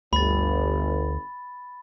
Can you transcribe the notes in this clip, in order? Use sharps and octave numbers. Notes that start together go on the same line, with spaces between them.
G1 D2 B5 A6